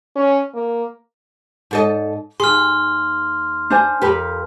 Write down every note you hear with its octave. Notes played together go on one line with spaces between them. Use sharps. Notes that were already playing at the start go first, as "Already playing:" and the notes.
C#4
A#3
G#2 A4 D#5
D#2 G#4 C6 F6
D4 C5 G#5
F2 G4 A#4 B4